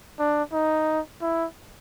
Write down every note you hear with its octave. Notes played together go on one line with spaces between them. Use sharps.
D4
D#4
E4